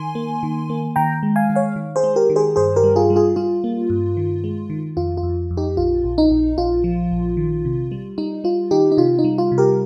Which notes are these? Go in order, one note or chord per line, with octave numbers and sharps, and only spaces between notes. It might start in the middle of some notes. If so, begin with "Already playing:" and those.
Already playing: D#3 G#5 C6
A#3
D#3
A#3
D#3 G5 A#5
G#3
F5 G#5
D#3
C#5 F5
D#3
G#4 C5
G#3
G4 A#4
D#3
G#4 C5
G2 G#4 C5
G4 A#4
G3
F4 G#4
G3
F4 G#4
G3 F4
A#3
G2
D#3
G#3
D#3
F2 F4
F4
F2
F2
D#4 G4
A#1 F4
A#1
D#4
A#1
A#1 F4
F3
A#1
D#3
C3
G3
G3 D#4
G3 F4
D#3 D#4 G4
D#4
C3 F4
D#4
G3
F4
C3
G4 A#4